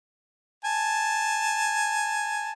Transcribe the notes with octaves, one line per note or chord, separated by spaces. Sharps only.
G#5 A5